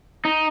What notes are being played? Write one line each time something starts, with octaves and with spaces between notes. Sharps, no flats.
D#4